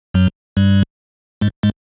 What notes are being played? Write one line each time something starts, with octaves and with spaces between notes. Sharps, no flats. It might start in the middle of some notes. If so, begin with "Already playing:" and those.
F#2 F#3
G2 G3
G#2 G#3
G#2 G#3